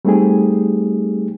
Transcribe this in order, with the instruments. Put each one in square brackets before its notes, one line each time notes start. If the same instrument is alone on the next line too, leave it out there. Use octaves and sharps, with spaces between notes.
[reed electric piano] G3 A3 C4 D#4 G4 G#4